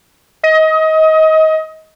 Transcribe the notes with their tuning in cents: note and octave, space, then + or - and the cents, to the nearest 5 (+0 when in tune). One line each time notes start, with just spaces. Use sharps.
D#5 +25